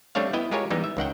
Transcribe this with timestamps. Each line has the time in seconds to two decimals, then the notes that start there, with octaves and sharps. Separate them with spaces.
0.15 G3 A3 C4 D4 C#5 F5
0.33 B3 E4 D#5 G5
0.51 G#3 F4 G4 A#4 C#5 G#5
0.70 E3 G3 G#3 B3 D#4
0.84 E5
0.97 C#2 D#3 F#5 G5